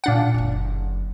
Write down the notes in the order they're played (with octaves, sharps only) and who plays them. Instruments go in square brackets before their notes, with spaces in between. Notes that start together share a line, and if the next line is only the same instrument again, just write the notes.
[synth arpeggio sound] A#2 D4 F#5
[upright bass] F#1 D3